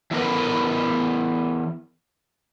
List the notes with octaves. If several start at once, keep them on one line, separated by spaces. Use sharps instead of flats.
E3 F#3 B3 A#4 B4